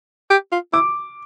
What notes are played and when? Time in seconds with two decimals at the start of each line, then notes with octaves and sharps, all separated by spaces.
0.30 G4
0.52 F4
0.73 E4 D6